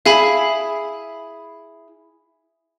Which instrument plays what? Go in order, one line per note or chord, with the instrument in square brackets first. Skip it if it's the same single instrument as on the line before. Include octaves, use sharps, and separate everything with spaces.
[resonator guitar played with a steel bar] E4 G#4 [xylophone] F5 G#5 B5